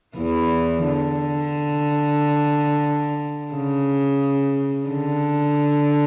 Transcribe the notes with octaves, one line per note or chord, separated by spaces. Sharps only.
E2 E3
D3
C#3
D3